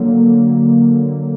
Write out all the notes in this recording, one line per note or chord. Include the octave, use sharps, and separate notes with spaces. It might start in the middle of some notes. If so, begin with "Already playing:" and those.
Already playing: D3 F#3 A#3